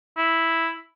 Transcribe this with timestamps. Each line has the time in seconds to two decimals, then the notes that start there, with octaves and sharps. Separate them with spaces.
0.17 E4